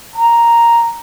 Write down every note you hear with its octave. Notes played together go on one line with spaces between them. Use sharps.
A#5